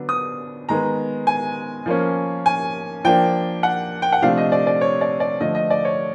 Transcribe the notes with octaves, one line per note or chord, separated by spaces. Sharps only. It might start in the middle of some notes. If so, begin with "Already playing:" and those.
Already playing: D3 F#3 B3 D4
D#6
D#3 G#3 B3 A#5
G#5
F3 A#3 C#4
G#5
F3 A#3 D4 G5
F#5
G5
F#5
C3 F3 A3 D4 F5
D#5
D5
D5
C#5
D5
D5
D3 F3 A3 D#5
D#5
D5
C#5